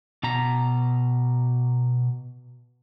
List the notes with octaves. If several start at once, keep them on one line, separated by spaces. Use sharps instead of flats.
B2 A#5